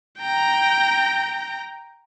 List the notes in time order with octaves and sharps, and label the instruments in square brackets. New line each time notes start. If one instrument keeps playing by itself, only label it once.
[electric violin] G5 A#5